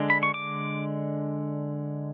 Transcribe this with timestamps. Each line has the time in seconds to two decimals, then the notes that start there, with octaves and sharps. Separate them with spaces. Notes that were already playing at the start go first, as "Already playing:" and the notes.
Already playing: D3 G#3 D4
0.10 B5
0.23 C#6
0.34 D6